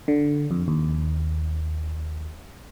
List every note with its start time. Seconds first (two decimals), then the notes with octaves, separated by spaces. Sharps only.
0.08 D3
0.51 F2
0.68 D#2